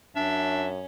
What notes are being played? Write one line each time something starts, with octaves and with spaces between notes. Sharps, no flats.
F#2 C#4 D4 E5